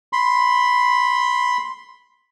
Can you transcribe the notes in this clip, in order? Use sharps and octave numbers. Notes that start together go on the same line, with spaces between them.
B5 C6